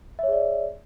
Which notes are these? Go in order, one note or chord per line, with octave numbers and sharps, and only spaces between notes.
G#4 C#5 D5 E5